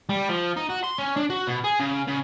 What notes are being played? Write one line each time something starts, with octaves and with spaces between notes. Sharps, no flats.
G3
F3
D#4
F#4
C6
C#4
D4
F#4
B2
G#4
C#3
C#3